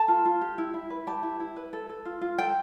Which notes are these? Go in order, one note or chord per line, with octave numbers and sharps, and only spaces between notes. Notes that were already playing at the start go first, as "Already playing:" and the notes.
Already playing: A4 A5
F4
F4
G4
E4
E4
B4
G4 A5
E4
E4
B4
A4
A4
F4
F4
A4 G5